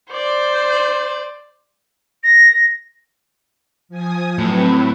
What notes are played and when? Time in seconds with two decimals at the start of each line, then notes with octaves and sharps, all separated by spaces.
0.11 C5 D5
2.23 A#6
3.89 F3 G#5 D#6
4.38 A2 F#3 C4 B4